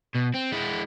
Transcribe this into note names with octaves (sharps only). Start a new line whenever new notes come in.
B2
C4
G#3 E4